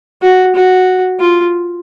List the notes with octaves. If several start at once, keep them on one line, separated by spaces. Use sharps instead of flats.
F#4
F#4
F4